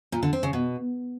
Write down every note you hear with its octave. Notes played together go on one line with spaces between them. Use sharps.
A#2
D3
C4
C#3
B2